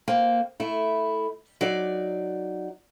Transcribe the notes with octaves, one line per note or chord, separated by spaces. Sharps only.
A#3 C4
A3 E4
F#3 D#4 D5